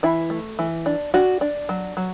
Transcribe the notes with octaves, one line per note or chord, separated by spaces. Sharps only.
E3 E4
A3
E3
D4
D4 F#4
D4
F#3
F#3